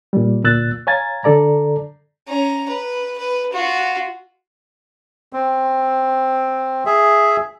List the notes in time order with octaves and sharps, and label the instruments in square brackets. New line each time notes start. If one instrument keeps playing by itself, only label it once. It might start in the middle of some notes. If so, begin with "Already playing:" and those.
[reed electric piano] A#2 G3
D2 A#2 E6 F#6 A6
C#5 F5 G#5 A#5 G#6 A6
D3 A4 D5 A#5
[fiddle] C#4 A#5
B4
B4
F4 F#4
[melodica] C4
G#4 E5